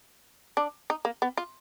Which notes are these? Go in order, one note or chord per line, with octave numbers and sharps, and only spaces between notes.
D4
D#4
A#3
B3
F4